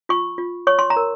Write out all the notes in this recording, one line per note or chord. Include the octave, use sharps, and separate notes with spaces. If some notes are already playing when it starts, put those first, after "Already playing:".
F4 C#6
F4
C#5 C#6
C6
A#5
A#4